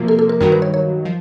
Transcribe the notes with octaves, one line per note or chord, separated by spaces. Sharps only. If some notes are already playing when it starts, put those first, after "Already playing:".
Already playing: C3 F3 A#3
A4
A4
A#4
G2 D#3 F#3 A#4
B4
C#5
C#5
F3